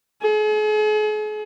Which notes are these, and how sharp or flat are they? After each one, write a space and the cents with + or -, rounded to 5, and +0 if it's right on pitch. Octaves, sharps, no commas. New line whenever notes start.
G#4 +45